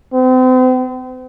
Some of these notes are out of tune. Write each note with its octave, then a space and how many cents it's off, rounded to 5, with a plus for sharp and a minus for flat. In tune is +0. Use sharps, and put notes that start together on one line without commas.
C4 -40